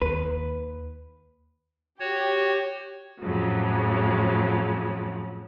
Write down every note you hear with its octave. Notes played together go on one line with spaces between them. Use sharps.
D#2 B4
F#4 G4 C#5
F2 A2 C#3 F3 F#3